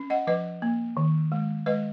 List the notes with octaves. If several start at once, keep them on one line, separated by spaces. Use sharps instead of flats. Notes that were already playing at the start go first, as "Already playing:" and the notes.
Already playing: C#4
D#5 F#5
F3 B4 D#5
A#3
D#3
G#3
G#3 B4 D#5